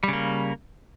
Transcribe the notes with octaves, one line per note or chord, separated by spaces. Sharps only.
C#3 G3 A#3